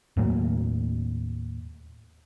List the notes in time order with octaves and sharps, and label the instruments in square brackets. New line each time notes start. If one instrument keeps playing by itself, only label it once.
[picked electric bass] D#2 A2 F#3 A#3